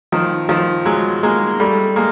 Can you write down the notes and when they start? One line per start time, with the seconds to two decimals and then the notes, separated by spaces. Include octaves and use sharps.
0.12 D#3 F3
0.49 D#3 F3
0.86 F#3 G#3
1.23 G#3 A#3
1.60 G3 A3
1.96 G#3 A#3